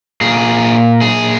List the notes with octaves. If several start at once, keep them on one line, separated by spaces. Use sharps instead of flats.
A#2 G#4
G#4